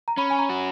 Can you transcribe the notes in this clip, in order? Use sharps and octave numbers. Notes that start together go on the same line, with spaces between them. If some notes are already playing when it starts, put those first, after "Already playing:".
A#5
C#4 B5
G#5
A#5
F#4